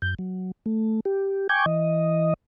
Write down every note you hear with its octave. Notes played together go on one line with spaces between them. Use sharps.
F#2 G6
F#3
A3
G4
G5 G#5 C#6 D6 G6 G#6
E3 D#5